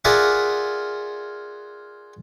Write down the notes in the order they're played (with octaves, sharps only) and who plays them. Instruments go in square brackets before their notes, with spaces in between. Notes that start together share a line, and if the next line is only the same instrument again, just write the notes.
[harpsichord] F4 G#4 A#4 D5 E5 F#5